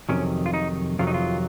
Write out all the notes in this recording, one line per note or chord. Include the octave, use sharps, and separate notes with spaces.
F2 C3 D#3 F#3 C#4
F4
D#4
F2 C3 D#3 F#3 F4
D#4
F4